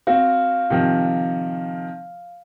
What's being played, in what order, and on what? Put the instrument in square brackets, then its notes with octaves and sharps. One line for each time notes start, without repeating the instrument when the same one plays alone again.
[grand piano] C4 F#4 [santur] F5
[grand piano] C3 D#3 F3